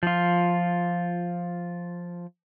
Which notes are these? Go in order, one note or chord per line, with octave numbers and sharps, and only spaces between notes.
F3 F4